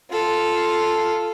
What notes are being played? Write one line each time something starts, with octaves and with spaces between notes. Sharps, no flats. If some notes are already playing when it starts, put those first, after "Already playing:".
F4 A4